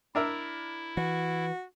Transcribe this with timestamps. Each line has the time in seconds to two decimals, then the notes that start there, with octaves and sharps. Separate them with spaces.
0.15 D4 E4 A#4 E5
0.97 E3 F#4